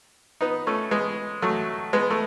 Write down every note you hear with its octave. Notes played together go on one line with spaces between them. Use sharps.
B3 D#4
A3 C#4
G#3 B3
F#3 A3
G#3 B3
A3